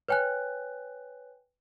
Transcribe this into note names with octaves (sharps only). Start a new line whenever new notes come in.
B4 C#5 G5 G#5 F#6